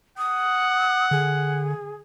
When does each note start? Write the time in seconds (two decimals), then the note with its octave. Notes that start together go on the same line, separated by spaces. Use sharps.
0.18 F#5 D#6
1.11 D3 G#4